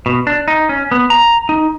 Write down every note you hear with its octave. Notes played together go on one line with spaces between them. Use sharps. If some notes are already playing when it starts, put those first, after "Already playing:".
B2
D4
D#4
C#4
B3
A#5
D#4